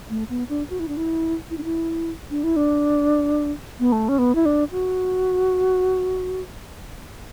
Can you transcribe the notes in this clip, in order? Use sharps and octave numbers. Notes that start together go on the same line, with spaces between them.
A3
B3
D4
F#4
E4
D4
E4
E4
D4
E4
D4
E4
D4
B3
A3
C#4
B3
E4
D4
F#4